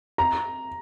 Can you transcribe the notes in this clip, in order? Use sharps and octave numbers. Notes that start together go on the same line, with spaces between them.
A#5